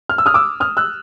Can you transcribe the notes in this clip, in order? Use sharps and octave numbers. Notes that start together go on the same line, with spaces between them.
F6
E6
D#6 F6
D6 E6
D#6 F6
E6 F#6